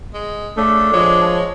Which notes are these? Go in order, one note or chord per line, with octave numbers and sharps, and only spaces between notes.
G#3
C#3 A3 D4
F3 G#3 C#5